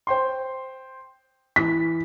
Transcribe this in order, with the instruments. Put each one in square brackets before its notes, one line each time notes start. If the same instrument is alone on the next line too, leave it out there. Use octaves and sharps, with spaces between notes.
[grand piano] C5 G5 C6
[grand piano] E3 [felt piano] B6